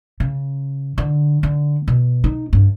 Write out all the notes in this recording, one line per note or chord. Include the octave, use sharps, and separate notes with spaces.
C#3
D3
D3
B2
D#4
G2